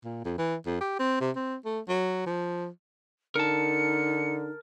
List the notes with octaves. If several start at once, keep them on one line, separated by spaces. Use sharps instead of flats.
A#2
F2
E3
F2
G4
C4
C3
C4
A3
F#3
F3
D3 D#4 A#4 A5 C#7